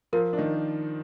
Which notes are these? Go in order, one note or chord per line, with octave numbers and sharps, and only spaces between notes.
F3 F4 A#4
D4
D#3 D#4